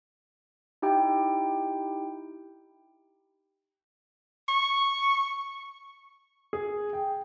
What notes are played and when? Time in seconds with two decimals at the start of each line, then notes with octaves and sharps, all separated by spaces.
0.82 D#4 E4 G4 G5
4.48 C#6
6.53 G#4
6.93 G5